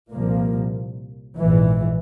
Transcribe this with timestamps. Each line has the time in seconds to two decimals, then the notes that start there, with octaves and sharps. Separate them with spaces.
0.13 C2 A#2 F3 A#3
1.39 A#1 G#2 E3